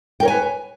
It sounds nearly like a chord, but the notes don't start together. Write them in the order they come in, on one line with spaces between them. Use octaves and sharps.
G5 A#4 C#5 G#5 B4